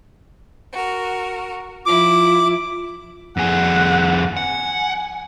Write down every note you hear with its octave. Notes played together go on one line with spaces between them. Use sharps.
F#4 A#4
F3 E4 F4 D6
F2 G#4 F#5
F#5 G#5